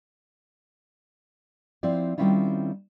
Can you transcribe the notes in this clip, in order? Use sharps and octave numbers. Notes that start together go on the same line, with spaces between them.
F3 C4 E4 D5
D#3 G3 C4 C#4 E4 F4